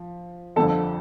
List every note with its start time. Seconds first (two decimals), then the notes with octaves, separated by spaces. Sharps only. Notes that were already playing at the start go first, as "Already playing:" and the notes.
Already playing: F3
0.56 G1 F2 D3 F3 A4